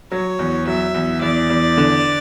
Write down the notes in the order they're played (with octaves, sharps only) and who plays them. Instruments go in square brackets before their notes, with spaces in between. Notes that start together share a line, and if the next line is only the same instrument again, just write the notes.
[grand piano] F#3 [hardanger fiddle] C#5
[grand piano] E2
[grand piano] F#3 [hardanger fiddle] E5
[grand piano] E2
[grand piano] E2 [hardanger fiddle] D5
[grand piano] E2
D3